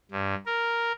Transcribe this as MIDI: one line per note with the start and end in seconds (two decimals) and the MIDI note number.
0.11 0.35 43
0.46 0.92 70